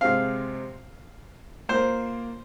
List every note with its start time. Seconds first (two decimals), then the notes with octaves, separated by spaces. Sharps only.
0.01 C3 G#3 C4 F5
1.69 A#3 F4 A#4 C5